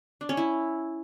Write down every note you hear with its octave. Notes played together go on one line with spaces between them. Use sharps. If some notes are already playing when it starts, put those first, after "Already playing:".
D4
C#4
E4